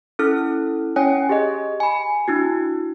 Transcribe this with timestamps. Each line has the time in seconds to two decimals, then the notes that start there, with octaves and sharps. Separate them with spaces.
0.19 C#4 E4 A4 F6
0.96 C#4 C#5 G5 G#5
1.29 G4 G#4 D#5
1.80 G#5 B5
2.28 D4 E4 F#4